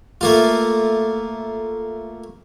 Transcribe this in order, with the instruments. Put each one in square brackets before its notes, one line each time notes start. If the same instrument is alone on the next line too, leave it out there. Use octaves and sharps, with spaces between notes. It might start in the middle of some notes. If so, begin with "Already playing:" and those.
[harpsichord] A3 A#3 F4